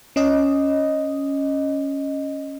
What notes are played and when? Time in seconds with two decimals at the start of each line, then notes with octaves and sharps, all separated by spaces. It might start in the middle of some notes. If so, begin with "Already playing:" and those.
0.16 C#4 D#5